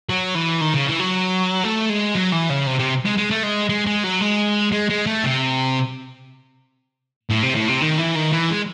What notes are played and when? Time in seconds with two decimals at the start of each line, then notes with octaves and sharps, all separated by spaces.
0.10 F#3
0.35 E3
0.61 D#3
0.74 C#3
0.87 E3
1.00 F#3
1.64 A3
1.89 G#3
2.15 F#3
2.32 E3
2.50 C#3
2.67 C3
2.79 C3
3.06 G#3
3.18 G#3
3.31 A3
3.43 G#3
3.69 G#3
3.87 G#3
4.04 F#3
4.21 G#3
4.72 G#3
4.90 G#3
5.06 A3
5.24 C3
7.30 A2
7.42 C3
7.55 A2
7.68 C3
7.81 D#3
7.98 E3
8.15 D#3
8.32 E3
8.50 G#3